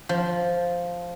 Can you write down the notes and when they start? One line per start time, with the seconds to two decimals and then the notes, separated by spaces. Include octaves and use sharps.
0.09 F3